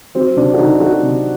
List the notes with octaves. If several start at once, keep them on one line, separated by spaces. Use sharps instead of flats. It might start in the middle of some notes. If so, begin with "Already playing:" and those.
F#3 C4
C3 D4
F#4
C3 D#4
F#3 F#4
C3